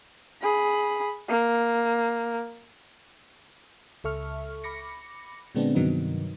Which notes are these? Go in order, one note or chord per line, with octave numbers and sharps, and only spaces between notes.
G#4 B5
A#3
C#2 A4 E5 C#6 F6
B5 D6 A#6 C#7
A#2 D3 G#3 B3 C4 D4
G2 C3 D#3 F#3 B3 D#4